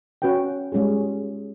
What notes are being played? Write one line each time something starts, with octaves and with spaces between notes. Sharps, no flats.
C#4 F#4 B4 F#5 G5
G3 G#3 C#4 F4 G#4